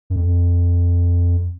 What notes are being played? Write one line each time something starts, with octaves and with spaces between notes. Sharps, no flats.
F#2
F2